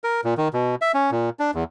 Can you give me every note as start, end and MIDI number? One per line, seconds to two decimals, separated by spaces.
0.04 0.21 70
0.24 0.34 46
0.38 0.48 51
0.53 0.75 47
0.82 0.92 76
0.94 1.10 61
1.11 1.30 46
1.39 1.51 62
1.55 1.64 40